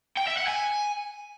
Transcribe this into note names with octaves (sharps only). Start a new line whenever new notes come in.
G5
E5
F#5
G#5